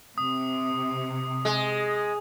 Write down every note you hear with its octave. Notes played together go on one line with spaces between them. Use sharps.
C3 D#6
G#3